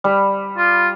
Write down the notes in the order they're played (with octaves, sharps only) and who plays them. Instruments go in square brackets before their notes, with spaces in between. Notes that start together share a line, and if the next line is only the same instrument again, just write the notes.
[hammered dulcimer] G3
[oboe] F4